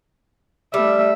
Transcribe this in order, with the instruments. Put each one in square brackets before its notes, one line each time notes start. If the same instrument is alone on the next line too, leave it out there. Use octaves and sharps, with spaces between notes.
[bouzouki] G3 [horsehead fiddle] A3 E5